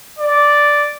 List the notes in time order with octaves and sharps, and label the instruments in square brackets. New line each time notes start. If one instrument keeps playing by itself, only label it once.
[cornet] D5